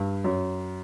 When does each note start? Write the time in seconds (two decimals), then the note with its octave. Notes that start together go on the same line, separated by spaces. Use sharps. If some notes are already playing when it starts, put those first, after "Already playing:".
Already playing: G2
0.24 F#2